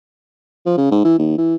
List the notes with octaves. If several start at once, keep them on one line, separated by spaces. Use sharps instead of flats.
F3
C#3
G#2
E3
D#2
E3